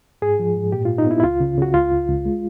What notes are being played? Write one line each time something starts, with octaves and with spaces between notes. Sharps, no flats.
G#2 G#4
F3
G#2
A#2 G4
F4
A#2
D#4
B3 E4
E4
C#2 F4
C#3
C#3 F#4
C#2 F4
C#2
C#2
G#3